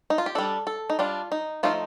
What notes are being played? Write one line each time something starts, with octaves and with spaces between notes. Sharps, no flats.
D#4
F4
G4
G3 D4 A4
A4
D#4
G3 D4 F4
D#4
F3 A3 D#4 F4